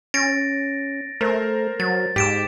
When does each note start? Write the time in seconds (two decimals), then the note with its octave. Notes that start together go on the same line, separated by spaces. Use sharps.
0.14 C#4 A6 A#6 D7
1.21 A3 A#4 C5
1.80 F#3 A6
2.16 G#2 G4 B6 D7 E7